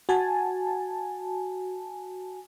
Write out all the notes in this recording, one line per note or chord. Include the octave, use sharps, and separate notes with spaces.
F#4 G#5 A5